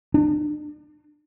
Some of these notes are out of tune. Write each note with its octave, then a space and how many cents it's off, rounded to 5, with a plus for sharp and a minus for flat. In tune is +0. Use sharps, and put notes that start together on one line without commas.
D4 +35